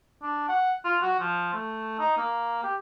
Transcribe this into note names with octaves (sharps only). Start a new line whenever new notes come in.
D4
F#5
F4
F#4
F3
A3
D#4
A#3
G4